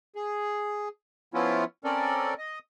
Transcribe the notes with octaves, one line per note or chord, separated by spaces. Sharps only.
G#4
F3 B3 C#4 E4 F4
C4 C#4 A4 A#4 D5
D#5